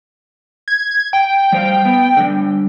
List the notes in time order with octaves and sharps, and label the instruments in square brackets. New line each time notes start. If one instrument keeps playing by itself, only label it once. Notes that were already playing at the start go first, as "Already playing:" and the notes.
[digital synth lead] G#6
G5
[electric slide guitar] G3 C5 F5
B3
D3 G3